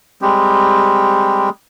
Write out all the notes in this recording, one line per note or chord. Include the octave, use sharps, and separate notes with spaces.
G3 G#3 C4 G4